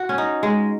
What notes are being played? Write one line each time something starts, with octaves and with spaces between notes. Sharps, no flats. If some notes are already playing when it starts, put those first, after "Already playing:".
Already playing: F#4
C#4
D#4
G#3